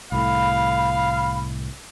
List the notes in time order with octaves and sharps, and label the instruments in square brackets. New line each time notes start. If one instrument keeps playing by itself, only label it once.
[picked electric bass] C2 A2 [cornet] F5 [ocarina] B5